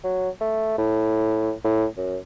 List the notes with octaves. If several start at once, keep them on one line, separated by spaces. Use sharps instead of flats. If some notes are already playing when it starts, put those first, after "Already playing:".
F#3
A3
A2
A2
F#2